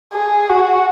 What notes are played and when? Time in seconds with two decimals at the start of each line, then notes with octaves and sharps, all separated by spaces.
0.14 G#4
0.50 F#4